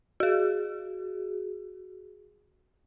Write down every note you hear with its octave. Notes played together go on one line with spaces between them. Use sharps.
F#4 G#4